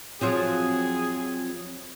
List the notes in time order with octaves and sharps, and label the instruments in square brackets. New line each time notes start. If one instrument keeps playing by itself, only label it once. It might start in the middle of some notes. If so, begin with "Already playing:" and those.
[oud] F3 F#3 F4 [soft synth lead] C4 [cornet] G#4